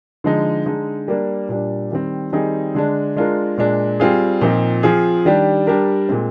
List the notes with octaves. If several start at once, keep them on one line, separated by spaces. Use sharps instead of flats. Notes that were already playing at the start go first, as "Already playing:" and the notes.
D3 F3 G#3 D#4
D3 G#3 D#4
G3 A#3 D4
A#2 G3 D4
D#3 G3 C4
D#3 G3 C4 D#4 G#4
D3 G#3 D4
G#3 D4 F4 A#4
A#2 G#3 D4
G3 C4 F4 G#4
A#2 F3 C4 D#4
F3 C4 F4 G#4
D#3 G3 D4 G4
G3 D4 G4 A#4
A#2 G#3 C4